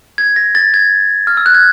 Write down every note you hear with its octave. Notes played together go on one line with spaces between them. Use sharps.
G#6
A#6
A6
G#6
F6
E6
F#6
G#6